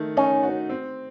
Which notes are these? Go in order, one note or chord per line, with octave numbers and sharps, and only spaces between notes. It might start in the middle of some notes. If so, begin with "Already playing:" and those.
Already playing: D#3 A3
C#4 D#4
F#4
C4